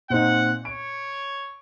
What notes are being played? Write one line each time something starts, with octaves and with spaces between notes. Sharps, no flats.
A#2 C4 D#4 F#5
C#5 D7